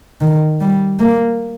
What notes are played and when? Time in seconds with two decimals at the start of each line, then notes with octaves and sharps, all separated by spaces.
0.21 D#3
0.61 G3
1.00 A#3